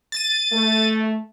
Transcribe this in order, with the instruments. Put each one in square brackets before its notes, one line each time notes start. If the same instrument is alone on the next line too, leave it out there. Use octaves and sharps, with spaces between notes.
[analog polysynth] A6 D#7
[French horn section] A3